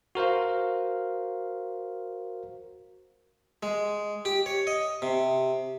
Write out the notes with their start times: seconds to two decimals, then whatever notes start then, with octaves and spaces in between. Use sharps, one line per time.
0.15 F#4 A#4 C5 F5
3.63 G#3
4.25 G4
4.46 C#5
4.67 D#5
5.02 C3